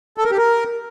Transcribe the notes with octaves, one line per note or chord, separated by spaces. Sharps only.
A4
A#4
G4
A#4